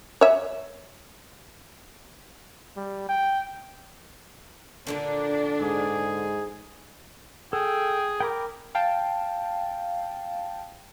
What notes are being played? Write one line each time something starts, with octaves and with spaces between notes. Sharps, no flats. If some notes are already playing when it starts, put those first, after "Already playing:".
C#5 E5
G3
G5
A#2 D3 D#3 D4
G#2 G#4
G#4 A4 G5
A#4 G5 B5 D6
F5 G5 A5